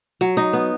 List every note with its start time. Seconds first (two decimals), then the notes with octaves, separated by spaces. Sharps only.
0.21 F#3
0.37 D#4
0.53 B3